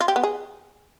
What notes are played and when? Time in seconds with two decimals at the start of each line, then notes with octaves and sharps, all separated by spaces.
0.01 F4
0.08 G4
0.16 B3
0.23 G#4